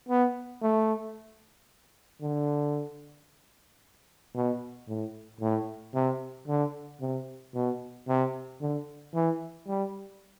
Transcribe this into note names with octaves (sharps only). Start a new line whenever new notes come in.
B3
A3
D3
B2
A2
A2
C3
D3
C3
B2
C3
D3
E3
G3